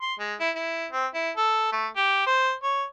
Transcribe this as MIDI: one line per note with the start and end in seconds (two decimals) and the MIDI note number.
0.01 0.14 84
0.19 0.35 56
0.40 0.50 64
0.55 0.86 64
0.91 1.06 60
1.14 1.30 64
1.37 1.72 69
1.72 1.87 57
1.96 2.24 67
2.26 2.52 72
2.63 2.84 73